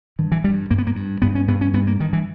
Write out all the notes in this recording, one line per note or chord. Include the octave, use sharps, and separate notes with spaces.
G2 D#3
E3
G2 G3
G2 A#3
B3
A#3
G2
G2 B3
C#4
G2 B3
C#4
G2 B3
A#3
G2 D#3
E3